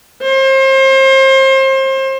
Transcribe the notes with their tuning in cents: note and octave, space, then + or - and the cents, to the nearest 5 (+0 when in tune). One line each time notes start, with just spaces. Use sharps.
C5 +35